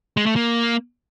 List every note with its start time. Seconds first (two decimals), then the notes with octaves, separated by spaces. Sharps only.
0.17 G#3
0.26 A3
0.36 A#3